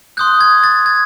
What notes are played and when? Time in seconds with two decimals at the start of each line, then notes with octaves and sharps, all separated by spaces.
0.17 C6 D#6 F#6 G6
0.41 G#6
0.63 A6
0.86 G#6